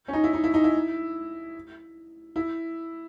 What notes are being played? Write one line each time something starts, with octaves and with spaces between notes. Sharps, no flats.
C#4
D#4
E4
D#4
E4
D#4
E4
E4